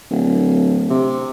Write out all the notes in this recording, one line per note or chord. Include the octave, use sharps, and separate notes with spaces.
D1
C3